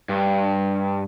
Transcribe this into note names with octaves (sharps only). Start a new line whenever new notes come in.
G2